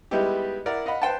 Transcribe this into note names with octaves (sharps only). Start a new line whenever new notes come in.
G3 G#3 B3 D#4 E4 G4
E4 A#4 D5 F#5
D#5 F5 F#5 B5
B4 C5 G5 A5